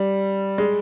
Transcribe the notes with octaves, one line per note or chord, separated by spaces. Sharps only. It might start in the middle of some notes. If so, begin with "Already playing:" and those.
Already playing: G3
G#3